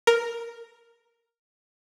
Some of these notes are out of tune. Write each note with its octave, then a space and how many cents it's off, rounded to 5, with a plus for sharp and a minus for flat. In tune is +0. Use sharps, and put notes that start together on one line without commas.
A#4 +0